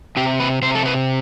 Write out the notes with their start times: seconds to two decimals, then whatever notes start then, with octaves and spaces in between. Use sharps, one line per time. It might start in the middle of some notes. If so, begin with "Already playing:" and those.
0.17 C3 G4
0.40 B4
0.62 C3 C5
0.75 A4
0.86 B4